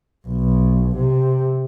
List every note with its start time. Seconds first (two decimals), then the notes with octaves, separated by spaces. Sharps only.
0.27 B1
0.96 C3